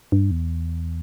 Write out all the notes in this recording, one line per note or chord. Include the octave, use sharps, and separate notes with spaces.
G2
E2